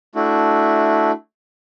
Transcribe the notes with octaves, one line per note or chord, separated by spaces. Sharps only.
A3 D4 E4 F#4